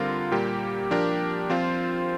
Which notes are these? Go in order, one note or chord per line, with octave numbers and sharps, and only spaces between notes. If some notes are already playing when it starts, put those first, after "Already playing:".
Already playing: D3 G3 C4 F4 A#4
A#2 G3 A#3 G4
F3 D4 G4 A#4
F3 C4 F4 C5